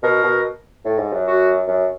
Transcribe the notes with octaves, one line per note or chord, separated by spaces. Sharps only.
B2 A#4
B2
A2
G#2
F#2
F#4
F#2